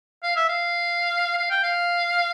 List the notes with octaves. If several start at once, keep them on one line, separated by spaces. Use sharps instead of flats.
F5
E5
F5
F5
G5
F5